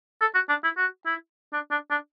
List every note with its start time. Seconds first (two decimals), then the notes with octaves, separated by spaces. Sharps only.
0.21 A4
0.35 F#4
0.49 D4
0.64 E4
0.77 F#4
1.06 E4
1.53 D4
1.71 D4
1.91 D4